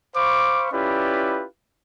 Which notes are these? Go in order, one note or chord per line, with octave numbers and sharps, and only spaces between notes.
C5 F5 B5 C#6 D6
C#4 E4 F4 G4 B4 D5